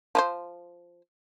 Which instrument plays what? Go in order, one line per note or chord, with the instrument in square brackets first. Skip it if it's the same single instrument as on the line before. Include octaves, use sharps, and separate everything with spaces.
[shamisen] F3 B4 C5